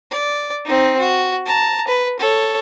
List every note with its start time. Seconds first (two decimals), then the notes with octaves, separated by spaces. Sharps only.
0.11 D5
0.65 C4 D#4
0.98 F#4
1.46 A5 A#5
1.87 B4
2.19 A4 C#5